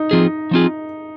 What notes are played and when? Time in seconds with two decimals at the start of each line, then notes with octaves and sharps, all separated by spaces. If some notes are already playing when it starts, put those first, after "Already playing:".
Already playing: D#4
0.11 F3 C4 F4 G#4
0.51 F3 C4 F4 G#4